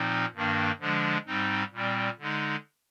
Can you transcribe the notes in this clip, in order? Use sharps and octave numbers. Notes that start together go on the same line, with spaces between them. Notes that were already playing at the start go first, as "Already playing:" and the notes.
Already playing: A#2 F3 C4 D#4
G2 D#3 A#3 D4
D3 F3 G#3 D4
G#2 G3 C4 D#4
A#2 G3 C4
D3 G#3 D#4